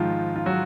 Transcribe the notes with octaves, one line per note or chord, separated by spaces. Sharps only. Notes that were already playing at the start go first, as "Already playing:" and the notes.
Already playing: G#2 D#3 F3 F4
F4
F#3 F#4